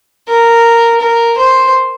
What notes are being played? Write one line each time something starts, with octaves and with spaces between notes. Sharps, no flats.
A#4
A#4
C5